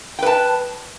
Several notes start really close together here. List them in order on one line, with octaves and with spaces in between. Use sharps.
G5 B4 A5